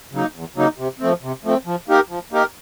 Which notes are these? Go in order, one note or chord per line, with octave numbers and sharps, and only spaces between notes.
C#3 F#3 A#3 D#4
E2
C#3 F#3 A#3 D#4
C3
F3 A3 C4
C3
F3 A3 C4
F3
A#3 D#4 G4 A#4
F3
A#3 D#4 G4 A#4